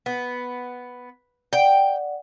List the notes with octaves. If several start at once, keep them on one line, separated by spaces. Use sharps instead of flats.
B3
D5 F#5 G5